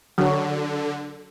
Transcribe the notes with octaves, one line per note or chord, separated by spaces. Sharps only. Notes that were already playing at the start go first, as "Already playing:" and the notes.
D3 F#3